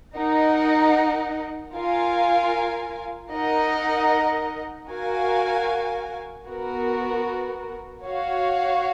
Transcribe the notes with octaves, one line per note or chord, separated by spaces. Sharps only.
D#4 A#4 D#5 F#5
F4 A#4 F5 G#5
D#4 A#4 D#5 F#5
F#4 A#4 F5 G#5
B3 F#4 A#4
F#4 C#5 F5